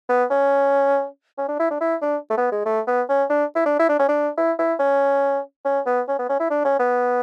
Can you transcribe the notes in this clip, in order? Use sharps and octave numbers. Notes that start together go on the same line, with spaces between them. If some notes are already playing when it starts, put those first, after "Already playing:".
B3
C#4
C#4
D4
E4
D4
E4
D4
A3
B3
G#3
A3
B3
C#4
D4
E4
D4
E4
D4
C#4
D4
E4
E4
C#4
C#4
B3
C#4
B3
C#4
E4
D4
C#4
B3